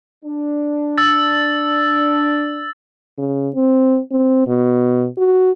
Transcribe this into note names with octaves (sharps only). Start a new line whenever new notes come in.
D4
E6 A6
C#3
C4
C4
B2
F#4